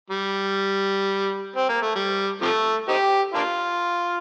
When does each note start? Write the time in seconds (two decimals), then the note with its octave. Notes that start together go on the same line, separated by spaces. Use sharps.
0.10 G3
1.56 C4
1.69 A#3
1.82 A3
1.96 G3
2.42 C3 F3 A3
2.88 C4 D#4 G4
3.34 A#3 D4 F4